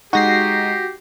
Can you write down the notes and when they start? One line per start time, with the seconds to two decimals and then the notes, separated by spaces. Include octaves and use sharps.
0.13 G#3 D#4 F#4 G4 A#6 C7